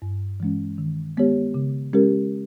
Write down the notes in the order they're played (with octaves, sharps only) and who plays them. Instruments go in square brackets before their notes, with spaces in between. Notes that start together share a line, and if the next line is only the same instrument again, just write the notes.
[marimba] G2
E3 G#3 C#4
D#3
G#3 B3 G4 C#5
C#3
G#3 C#4 G4 A#4